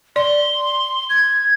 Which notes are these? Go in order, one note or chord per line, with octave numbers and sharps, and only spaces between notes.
D5 C6
G#6